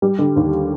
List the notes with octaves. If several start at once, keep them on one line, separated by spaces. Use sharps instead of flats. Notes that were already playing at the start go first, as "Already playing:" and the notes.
G3
D3
D#2